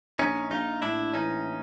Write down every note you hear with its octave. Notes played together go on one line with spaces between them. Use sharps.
A#1 C#4 D#4
A#1 D#4 F4
A2 D4 E4
E3 C#4 D#4